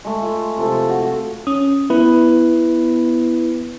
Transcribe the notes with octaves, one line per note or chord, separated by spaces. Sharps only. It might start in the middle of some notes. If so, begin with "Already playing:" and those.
G#3 A3
F4
C3 F3 A4
F#4
C#4 D#6
B3 E4 B4